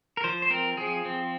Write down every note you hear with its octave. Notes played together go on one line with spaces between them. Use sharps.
A#4
F3 C5
C5
C4 A#4
F3 G#4
C4